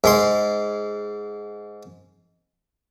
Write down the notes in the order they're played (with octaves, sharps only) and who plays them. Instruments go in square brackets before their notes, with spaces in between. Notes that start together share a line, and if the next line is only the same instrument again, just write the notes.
[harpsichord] G#2 G#3 C6